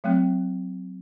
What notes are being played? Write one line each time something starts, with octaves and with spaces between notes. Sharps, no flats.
F#3 A3 C4